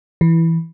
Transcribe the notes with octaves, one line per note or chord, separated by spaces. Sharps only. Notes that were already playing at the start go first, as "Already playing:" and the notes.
E3